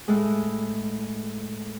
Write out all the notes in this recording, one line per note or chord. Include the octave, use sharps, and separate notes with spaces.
A2 G#3